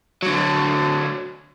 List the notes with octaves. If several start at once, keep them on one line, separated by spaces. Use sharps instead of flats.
D3 F#3